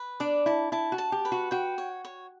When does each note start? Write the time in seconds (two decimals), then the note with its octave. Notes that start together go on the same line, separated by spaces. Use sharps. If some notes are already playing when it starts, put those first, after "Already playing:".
Already playing: B4
0.20 D4 D5
0.46 E4 A5
0.72 E4 A5
0.92 F#4
0.98 A5
1.12 G4
1.25 B4
1.32 F#4
1.51 F#4 G5
1.78 C#5
2.05 C#5